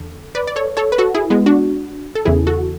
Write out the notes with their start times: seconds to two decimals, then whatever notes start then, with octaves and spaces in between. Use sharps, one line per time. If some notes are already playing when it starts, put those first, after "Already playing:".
Already playing: E2 D3 A4
0.35 B4 D5
0.47 D5
0.56 A4 C#5
0.77 A4 C#5
0.92 B4
0.98 F#4 A4
1.14 E4 G#4
1.30 G#3 B3
1.46 D4 F#4
2.15 A4
2.25 E2 C#3 E3 E4 G#4
2.47 F#4 A4